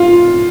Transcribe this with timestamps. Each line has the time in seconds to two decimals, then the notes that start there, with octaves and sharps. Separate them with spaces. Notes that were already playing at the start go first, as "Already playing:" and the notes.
Already playing: F4